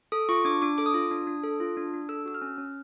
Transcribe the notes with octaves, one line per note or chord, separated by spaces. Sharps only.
A4 D#6
F4 C#6
D4 D6
D4 D6
A4 D6
D#6
F4
D4
D4
A4
F4
D4
D4
A4 E6
F#4 E6
F6
C#4
C#4